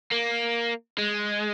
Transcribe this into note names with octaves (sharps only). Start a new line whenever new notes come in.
A#3
G#3